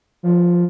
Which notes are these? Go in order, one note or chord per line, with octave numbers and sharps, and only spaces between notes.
F3